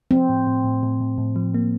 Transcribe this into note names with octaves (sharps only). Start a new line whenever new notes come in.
F3 C4
A2
A2
A2
A2
A2
A2
F3
A#3